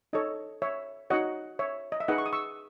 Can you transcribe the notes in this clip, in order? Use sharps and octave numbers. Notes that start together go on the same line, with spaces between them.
D#4 A4 C#5 D#5
C#5 E5
D#4 F#4 C#5 D#5 F#5
C#5 E5
D#5
E5
D#4 G#4 B4 D#5 F#5
C#6
D#6
C#6 E6